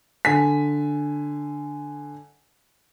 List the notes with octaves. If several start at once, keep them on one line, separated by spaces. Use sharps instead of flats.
D3 G#5 B6